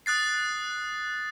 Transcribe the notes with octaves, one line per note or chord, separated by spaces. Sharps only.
D#6 F#6 A6 C7